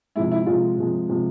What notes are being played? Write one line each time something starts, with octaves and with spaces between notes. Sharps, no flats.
C3 F3 G#3 E4
E4
C3 F3 G#3 F4
C3 F3 G#3
C3 F3 G#3